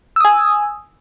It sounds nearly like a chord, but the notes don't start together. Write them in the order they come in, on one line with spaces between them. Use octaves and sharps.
E6 D#6 G#5